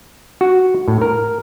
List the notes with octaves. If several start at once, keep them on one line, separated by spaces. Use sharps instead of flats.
F#4
A2
A#4